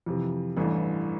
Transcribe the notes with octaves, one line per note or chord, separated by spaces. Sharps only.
F2 C3 E3
A1 G2 E3 A3